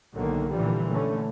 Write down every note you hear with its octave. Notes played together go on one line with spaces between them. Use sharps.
B1 B2 D3 D#3 A#3
A#2 D3 E3 F3 G3
D3 A3 C#4